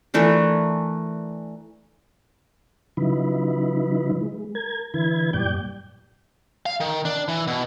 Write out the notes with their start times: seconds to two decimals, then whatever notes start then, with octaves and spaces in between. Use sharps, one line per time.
0.14 E3 A3 D4 A#4
2.97 C#3 F3 F#3 D#4 E4 B4
4.21 G#3
4.55 A#4 G#6
4.94 D3 E3 E4 B4 G#6
5.33 F#2 A#2 G3 D5 G5 G6
6.66 F5
6.80 D#3
7.05 D4
7.28 E3
7.47 B2